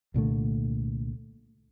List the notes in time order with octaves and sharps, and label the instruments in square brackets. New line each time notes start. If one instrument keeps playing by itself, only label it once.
[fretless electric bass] C2 A#2 D3 A3